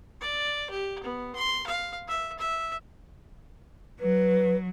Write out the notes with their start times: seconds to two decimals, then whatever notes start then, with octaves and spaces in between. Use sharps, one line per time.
0.21 D5
0.70 G4
1.03 B3
1.35 C6
1.67 F5
2.08 E5
2.38 E5
4.00 F#3 B4